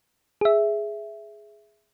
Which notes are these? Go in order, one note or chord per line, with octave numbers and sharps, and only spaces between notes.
G#4 E5